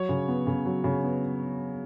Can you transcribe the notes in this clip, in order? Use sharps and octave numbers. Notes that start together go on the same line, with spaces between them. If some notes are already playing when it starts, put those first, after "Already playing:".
Already playing: F#3 C#5
C#3
B3
C#3
F#3
C#3
B3